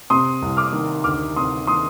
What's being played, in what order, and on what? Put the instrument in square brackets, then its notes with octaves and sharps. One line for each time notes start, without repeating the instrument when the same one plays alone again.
[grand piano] C3 C6 D#6
C2
D6 F6
D#3
D2 D6 F6
C3 C6 D#6
D#3 C6 D#6